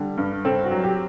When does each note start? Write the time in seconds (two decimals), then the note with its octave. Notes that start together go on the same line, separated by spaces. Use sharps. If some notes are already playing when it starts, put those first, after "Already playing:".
Already playing: D3 G3
0.18 G2
0.45 C4 A4
0.64 F#4
0.71 F#3
0.84 G4